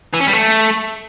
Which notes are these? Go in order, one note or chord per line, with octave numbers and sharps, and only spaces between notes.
E3
C#4
G3
A3